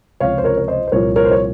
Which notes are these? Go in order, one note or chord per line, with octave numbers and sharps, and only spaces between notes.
C#2 C3 F3 C#5 F5
C5
A#4 C#5
C#5
C5 D#5
C5
C2 A#2 F3 A#4 C#5
A#4 C#5
C5
C#5